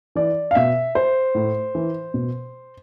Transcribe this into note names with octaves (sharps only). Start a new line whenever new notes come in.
E3 D5
F5
B2 E5
C5
A2
E3
B2